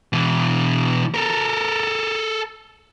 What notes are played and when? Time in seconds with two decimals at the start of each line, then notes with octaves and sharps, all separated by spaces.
0.13 B2 E3
1.14 A4 A#4